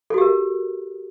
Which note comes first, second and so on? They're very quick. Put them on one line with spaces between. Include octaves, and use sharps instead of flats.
A4 F#4 G4 A#4